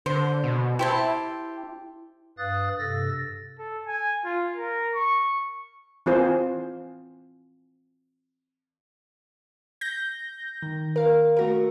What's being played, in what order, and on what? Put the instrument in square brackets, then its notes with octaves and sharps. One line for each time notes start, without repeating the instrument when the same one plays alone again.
[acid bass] D3 [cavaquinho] C5
[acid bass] B2
[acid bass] E4 [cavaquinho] G4 C5 A5
[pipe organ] G2 B4 F5 D#6 F#6 A6
G2 C3 A4 E6 A6 A#6
[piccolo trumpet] A4
G#5
F4
A#4
C#6
[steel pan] E3 C4 F4 G#4 C5
[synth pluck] G6 A#6
D#3
A#4 F5
A3 F#4 A#4